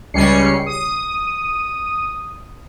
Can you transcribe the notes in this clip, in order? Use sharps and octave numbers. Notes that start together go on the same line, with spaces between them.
C#2 G3 C#4 C7 C#7
D#6